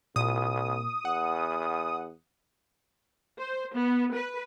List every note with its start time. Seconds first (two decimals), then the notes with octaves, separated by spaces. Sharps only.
0.16 C2 A#2 D#6
1.05 E2 F#5
3.39 C5
3.75 B3
4.14 B4